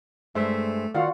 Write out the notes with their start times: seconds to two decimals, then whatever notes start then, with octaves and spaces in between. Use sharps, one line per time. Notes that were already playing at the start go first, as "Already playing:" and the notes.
0.35 G2 G#3 A3 C5 E5
0.94 D#3 F4 F#4 D5 F5 F#5